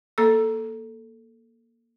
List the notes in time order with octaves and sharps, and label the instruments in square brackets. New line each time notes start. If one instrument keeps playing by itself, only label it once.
[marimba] A#3 A4 E6